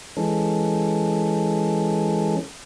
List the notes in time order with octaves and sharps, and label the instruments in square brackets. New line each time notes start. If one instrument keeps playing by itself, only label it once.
[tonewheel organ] E3 G#3 C#4 A4